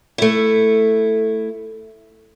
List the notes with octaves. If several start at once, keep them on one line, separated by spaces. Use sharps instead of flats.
A3 E4